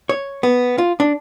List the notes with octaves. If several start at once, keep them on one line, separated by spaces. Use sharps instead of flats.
C#5
B3
F4
D4